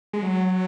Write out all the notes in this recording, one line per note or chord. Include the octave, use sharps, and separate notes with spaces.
G#3
F#3